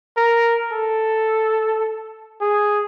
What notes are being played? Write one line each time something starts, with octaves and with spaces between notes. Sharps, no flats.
A#4
A4
G#4